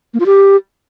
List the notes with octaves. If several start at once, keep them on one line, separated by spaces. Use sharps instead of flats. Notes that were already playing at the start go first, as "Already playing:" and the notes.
A#3
F4
G4